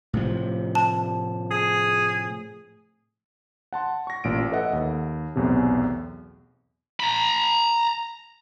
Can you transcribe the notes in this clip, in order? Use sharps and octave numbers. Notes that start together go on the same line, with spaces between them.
A2 C3 F3
A5
G#4
F#5 A5 C6
C#6 A#6
A1 A#2 D7
A4 B4 D#5 E5 F#5
D#2
B1 E2 A2 C3
A#5 B5